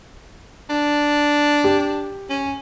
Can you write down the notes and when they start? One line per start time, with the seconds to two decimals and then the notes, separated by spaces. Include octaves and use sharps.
0.70 D4
1.64 G4
2.29 C#4